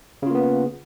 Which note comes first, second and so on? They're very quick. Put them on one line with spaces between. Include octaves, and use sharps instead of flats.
C#3 F4 A#3 B3